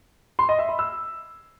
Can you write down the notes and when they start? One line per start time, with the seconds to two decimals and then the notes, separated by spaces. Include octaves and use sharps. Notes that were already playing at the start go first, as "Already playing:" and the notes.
0.39 C6
0.49 D#5
0.59 E5
0.69 B5
0.79 E6